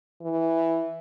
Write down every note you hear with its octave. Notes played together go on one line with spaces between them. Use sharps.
E3